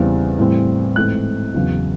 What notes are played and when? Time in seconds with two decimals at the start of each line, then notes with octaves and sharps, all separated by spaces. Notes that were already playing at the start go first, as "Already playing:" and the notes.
Already playing: E2 C#3 E3 G3 C4
0.39 A2 E3 G3 C4
0.96 G#2 E3 A3 C4 F#6
1.54 E2 C#3 F#3